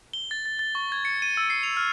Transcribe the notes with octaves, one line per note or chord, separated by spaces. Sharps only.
G7
A6
A6
A6
C#6
G#6
C#7
D#7
E6
C7
F7
F6